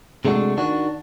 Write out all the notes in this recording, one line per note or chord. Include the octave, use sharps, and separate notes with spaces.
C3 G#3 A3 D4 F#4
D#3 D4 F#4